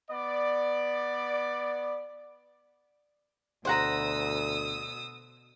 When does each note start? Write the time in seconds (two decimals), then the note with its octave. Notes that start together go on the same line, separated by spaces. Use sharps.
0.11 B3 D5
3.65 D2 B2 C5 F#5 A#5 D#6 E6